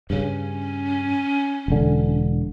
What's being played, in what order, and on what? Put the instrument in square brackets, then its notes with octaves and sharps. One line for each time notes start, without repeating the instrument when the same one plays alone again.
[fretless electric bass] G2 C#3 [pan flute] C#4
[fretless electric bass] E1 D3